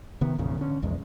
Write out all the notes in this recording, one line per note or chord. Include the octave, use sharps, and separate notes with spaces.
C3 D#3 B3
G#1 E2 A#2 C#3
D3 C#4
A#1 E2 G#3